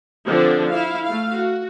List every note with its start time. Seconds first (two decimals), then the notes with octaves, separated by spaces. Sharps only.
0.25 D3 F3 C4 D4
0.70 E4 F5
1.03 A3 F5
1.31 F#4